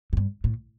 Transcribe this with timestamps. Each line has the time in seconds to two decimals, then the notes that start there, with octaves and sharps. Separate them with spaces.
0.13 A2
0.17 G2
0.44 A2